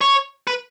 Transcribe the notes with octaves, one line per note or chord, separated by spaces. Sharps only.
C#5
B4